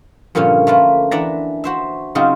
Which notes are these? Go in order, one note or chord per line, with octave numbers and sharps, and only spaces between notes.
G2 A#2 D3 F3 C#4
A3 A#3 F4 B4
E3 D4 D5 E5 F#5 A#5
F#4 C5 E5
C#3 F#3 C4 D#4 F4